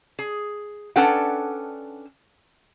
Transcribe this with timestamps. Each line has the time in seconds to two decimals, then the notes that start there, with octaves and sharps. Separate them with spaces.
0.19 G#4
0.96 C#4 D4 A4 B4 F#5 G5